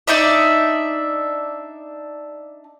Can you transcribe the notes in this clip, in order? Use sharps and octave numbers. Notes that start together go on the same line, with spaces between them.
D4 D#4 D5 E5